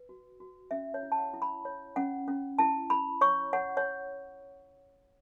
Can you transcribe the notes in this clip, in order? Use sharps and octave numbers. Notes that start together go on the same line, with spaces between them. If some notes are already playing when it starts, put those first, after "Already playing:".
Already playing: B4
F#4
F#4
C#4 E5
C#5
E4
A5
F#5
E4
B5
C#5
C#4 F#5
C#4
E4 A5
E4 B5
C#5 C#6
C#5 F#5
C#5